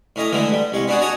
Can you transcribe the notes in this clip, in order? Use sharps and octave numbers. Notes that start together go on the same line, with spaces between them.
A2 C#4 D#5 A#5
D3 E3 G#3 A3
G3
C2 G#3 C#6
B3 C#4 D4 F#4 G#4
F#4 C#5 D#5 G#5 A#5